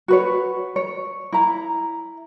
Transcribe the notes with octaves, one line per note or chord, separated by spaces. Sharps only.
F#4 B4 C#5
C#5
E4 A#5